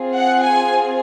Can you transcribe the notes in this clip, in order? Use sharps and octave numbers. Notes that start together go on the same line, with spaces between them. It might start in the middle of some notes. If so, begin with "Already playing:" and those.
Already playing: C4 F4 G#4
F#5
G#5